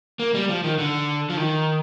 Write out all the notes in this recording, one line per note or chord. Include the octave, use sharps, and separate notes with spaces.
A#3
G3
F3
D#3
D3
F3
D#3